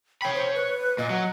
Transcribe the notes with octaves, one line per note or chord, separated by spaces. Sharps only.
C#5 G5 B5
C5
B4
A#2 D#5
F#3